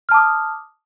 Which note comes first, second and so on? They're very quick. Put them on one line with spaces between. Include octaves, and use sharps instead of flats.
F6 A5 D6 D#6